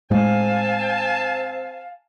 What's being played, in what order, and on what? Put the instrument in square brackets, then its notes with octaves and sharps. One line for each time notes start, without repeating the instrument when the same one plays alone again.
[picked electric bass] A2 G#3 [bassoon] C4 [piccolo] F5 [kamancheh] G#5 A5